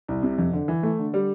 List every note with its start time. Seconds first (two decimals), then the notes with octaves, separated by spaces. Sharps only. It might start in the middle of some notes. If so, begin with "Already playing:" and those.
0.08 C2
0.23 C3
0.38 F2
0.53 D3
0.68 E3
0.83 A3
0.99 D3
1.14 G3